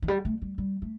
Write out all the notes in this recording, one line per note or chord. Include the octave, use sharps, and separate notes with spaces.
E3
G3
A3
G3
G3
A3